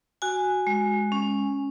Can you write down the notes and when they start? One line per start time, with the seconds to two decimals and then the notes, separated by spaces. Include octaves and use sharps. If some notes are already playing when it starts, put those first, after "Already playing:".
0.22 F#4 G#5
0.67 G#3
1.12 C#4